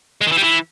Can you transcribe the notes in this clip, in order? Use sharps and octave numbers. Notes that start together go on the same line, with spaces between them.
G#3
D#3
E3
G3
E3